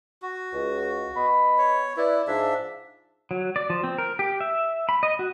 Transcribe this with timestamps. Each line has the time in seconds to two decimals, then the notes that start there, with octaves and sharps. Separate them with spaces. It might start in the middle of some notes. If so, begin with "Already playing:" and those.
0.22 F#4
0.52 C#2
1.15 B3 D#5 B5
1.58 C#5
1.97 E4 B4 D5
2.27 G#2 F3 D4 E5
3.31 F#3
3.56 D5
3.70 F3
3.84 C4
3.98 A#4
4.19 G4
4.41 E5
4.89 B5
5.03 D#5
5.19 F#4